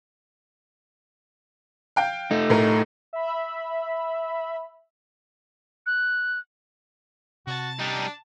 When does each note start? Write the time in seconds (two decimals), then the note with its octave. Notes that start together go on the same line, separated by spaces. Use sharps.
1.96 F5 G5 G6
2.31 A3 D#4
2.50 A2 A#4
3.13 E5 B5
5.86 F#6
7.47 C3 F#4 A5 A6
7.79 G3 D4 D#4